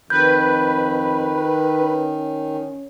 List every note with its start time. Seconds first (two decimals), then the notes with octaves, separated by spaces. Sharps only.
0.10 F2 D#3 B4 G6
1.81 C#4